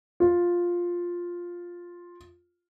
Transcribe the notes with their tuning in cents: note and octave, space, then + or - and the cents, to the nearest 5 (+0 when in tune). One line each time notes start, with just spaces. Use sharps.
F4 +5